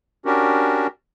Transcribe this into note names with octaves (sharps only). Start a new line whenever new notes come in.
C#4 D4 F#4 G4 A#4